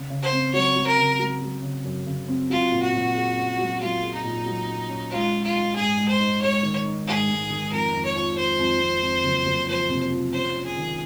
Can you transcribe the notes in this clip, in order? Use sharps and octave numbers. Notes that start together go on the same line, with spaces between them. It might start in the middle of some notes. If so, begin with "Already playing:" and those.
Already playing: C#3
C#3
C5
C4
F#3 C#5
F#3
A#4
C#3
F#3
F#3
C#3
F#2
C#3
C4
F#3 F4
A#2
F#4
A#2
G#4
C#4
F#3
F#3 F4
G#4
D#4
A#2
F#3
C#4
C#4
G#3 F4
D#4
F4
D#4
G#2 G#4
G#3
C5
D#4
G#3 C#5
D#3
D#4
G#2 G#4
G#2
D#3
F2 A#4
F2
C#5
F3
F3 C5
F2
F2
F2
F#1
F#1
F3 C5
C3
F3
C#4 C5
C#4
G#4
D#3